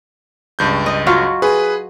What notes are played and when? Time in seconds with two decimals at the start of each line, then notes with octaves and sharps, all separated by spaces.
0.59 C#2 G2 G6
0.86 D#5
1.07 F#3 F4 F#4
1.42 G#4 B4